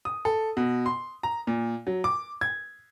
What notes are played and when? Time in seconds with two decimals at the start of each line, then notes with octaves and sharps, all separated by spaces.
0.05 D#6
0.25 A4
0.57 B2
0.86 C6
1.23 A#5
1.47 A#2
1.87 F#3
2.04 D6
2.41 G#6